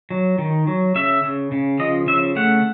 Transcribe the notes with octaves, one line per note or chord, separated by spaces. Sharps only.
F#3
D#3
F#3
C#3 E5
C#3
C#3
F3 D#5
C#3 E5
A3 F#5